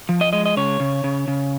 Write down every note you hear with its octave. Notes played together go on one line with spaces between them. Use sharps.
F3
D#5
G#3 D#5
D#5
C#3 C#5
C#3
C#3
C#3